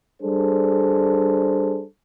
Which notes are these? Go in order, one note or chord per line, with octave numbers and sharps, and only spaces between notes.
G3 D4 G#4 A4 C5